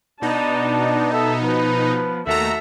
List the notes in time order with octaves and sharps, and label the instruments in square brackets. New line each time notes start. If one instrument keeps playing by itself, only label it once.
[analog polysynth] B2 D#4 [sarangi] B3 [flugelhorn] D4 [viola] A5
[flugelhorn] A4 [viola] E5
[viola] F3 [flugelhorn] B4
[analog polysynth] D#2 A3 A#5 [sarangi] F#4 [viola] A4 E5